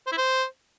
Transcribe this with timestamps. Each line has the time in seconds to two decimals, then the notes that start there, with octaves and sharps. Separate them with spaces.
0.07 C5
0.12 E4
0.17 C5